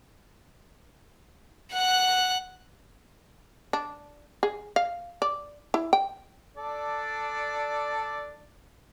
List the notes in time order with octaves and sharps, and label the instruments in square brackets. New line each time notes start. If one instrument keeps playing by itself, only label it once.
[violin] F#5 F#6
[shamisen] D4
G#4
F5
D5
E4
G5
[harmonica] D4 A4 D5